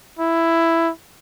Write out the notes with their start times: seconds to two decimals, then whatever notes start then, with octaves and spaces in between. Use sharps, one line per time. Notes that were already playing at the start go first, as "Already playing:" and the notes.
0.19 E4